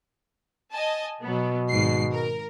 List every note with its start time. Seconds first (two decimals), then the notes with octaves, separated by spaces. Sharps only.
0.73 D#5 G#5 A5
1.21 B2 F#3 B3
1.70 G#1 G#2 C7
2.12 A#4